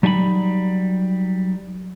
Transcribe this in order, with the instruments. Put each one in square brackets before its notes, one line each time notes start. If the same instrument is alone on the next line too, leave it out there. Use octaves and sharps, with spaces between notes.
[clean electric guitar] F#3 G3 D#4 G#5 B5